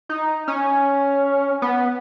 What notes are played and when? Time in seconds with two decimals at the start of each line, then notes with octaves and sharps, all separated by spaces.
0.09 D#4
0.48 C#4
1.62 B3